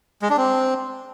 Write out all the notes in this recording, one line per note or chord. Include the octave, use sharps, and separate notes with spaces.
G#3
D4
C4